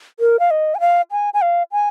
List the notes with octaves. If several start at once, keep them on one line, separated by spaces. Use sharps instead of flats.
A#4
F5
D#5
G#5
F5
G#5
G#5
F5
G#5